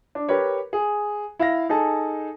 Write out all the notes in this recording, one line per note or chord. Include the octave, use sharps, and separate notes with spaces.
D4
G4 A#4 B4 C#5
G#4
E4 F5 A#6
D#4 G#4 A4 A5